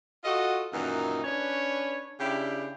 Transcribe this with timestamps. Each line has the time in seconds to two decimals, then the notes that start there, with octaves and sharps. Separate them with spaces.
0.24 F4 F#4 A4 D#5
0.73 F#2 A#2 D#3 E3 D#4
1.24 C#4 D4 B4 C#5
2.20 C#3 D4 E4 G4